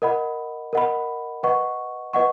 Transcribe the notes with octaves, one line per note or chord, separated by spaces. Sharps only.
A#4 D#5 F#5 B5
A#4 D#5 F#5 B5
B4 D#5 F#5 C#6
B4 D#5 F#5 C#6